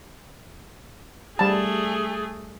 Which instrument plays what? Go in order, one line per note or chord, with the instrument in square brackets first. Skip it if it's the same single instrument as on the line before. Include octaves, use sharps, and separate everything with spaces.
[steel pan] G3 A5 [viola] A3 G#4